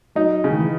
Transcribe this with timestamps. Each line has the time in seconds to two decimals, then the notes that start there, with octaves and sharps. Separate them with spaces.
0.15 F#3 D#4
0.44 C#3
0.49 D#3
0.58 E3